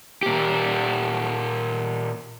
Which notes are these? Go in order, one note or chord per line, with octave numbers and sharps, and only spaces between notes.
A#2 G4